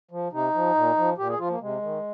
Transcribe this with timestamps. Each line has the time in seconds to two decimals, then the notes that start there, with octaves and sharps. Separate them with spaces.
0.11 F3
0.32 C3 D#4
0.54 F3
0.75 A#2
0.97 F3
1.18 A#2 G4
1.29 G#4
1.39 F3 F4
1.49 A#3
1.61 C3 G#3
1.82 D#3